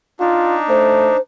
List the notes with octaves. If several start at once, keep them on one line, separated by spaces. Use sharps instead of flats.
D4 D#4 F4
A3 C5